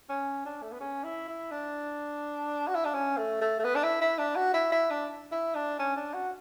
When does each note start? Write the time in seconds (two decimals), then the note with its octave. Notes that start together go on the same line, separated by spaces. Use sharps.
0.09 C#4
0.45 D4
0.62 A3
0.72 B3
0.80 C#4
1.04 E4
1.28 E4
1.51 D4
2.68 F#4
2.75 E4
2.85 D4
2.94 C#4
3.17 A3
3.41 A3
3.59 A3
3.65 B3
3.75 D4
3.84 E4
4.01 E4
4.18 D4
4.36 F#4
4.54 E4
4.72 E4
4.90 D4
5.32 E4
5.55 D4
5.79 C#4
5.96 D4
6.14 F#4